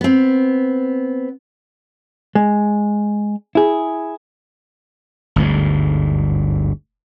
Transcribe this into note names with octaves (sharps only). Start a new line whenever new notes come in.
B3 C4
G#3
E4 G#4
G1 D2 G#2